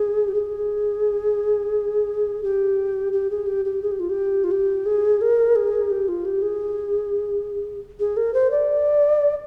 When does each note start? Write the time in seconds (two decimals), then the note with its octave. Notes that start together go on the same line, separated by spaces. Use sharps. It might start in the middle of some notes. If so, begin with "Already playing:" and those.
Already playing: G#4
0.28 G4
0.34 G#4
2.43 G4
3.13 G4
3.30 G#4
3.47 G4
3.65 G4
3.82 G#4
3.91 G4
4.00 F4
4.09 G4
4.44 F4
4.51 G4
4.86 G#4
5.21 A#4
5.56 G#4
5.90 G4
6.08 F4
6.25 G4
6.42 G#4
8.00 G#4
8.17 A#4
8.34 C5
8.51 D5